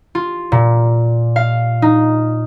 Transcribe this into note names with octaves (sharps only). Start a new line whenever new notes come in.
F4
A#2
F5
D#4